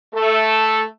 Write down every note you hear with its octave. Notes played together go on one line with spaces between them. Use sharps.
A3 A4